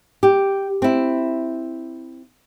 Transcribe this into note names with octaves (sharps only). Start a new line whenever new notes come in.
G4
C4 E4